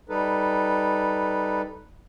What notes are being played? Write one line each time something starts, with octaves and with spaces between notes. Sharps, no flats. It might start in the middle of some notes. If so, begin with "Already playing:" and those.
G3 D#4 A4 B4